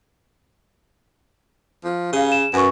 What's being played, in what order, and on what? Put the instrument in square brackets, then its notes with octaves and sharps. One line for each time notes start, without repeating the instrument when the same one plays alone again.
[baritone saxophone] F3
[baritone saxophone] C#3 [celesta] G4 F5
[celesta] E7
[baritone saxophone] F#2 [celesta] A#4 B4 C#6